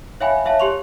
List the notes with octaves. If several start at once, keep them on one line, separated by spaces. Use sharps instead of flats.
C#5 E5 F5 G5 G#5 B5
C#5 E5 F5 A5
G4 C#5 C6 C#6 F7